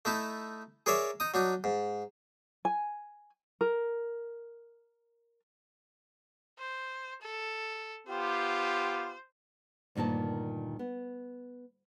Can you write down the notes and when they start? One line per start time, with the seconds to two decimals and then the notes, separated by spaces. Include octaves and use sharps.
0.05 A3 D#4 E4 A5
0.86 G#4 A#4 C#5 D5 E5
1.20 D#4 D#6
1.34 F#3 D4 D#4
1.64 G#2
2.65 G#5
3.61 A#4
6.59 C5
7.22 A4
8.08 B3 F4 G4 C5
9.95 D2 G2 A#2 D#3 A5
10.79 B3